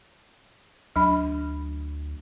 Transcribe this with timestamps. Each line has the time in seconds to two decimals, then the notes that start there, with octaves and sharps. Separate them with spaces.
0.96 D2 F#3 D4 B5